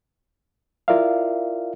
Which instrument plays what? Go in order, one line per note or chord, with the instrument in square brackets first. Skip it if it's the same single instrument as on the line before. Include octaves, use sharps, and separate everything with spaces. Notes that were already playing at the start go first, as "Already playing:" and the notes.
[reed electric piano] E4 F4 A#4 D5 E5 F5